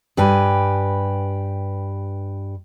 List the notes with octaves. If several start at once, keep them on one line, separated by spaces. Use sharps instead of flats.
G2 G4 B4 G#5